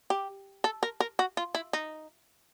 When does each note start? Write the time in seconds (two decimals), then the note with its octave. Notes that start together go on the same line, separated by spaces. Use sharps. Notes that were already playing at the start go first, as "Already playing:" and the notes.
0.10 G4
0.64 A4
0.83 A#4
1.00 A#4
1.19 F#4
1.37 F4
1.55 E4
1.73 D#4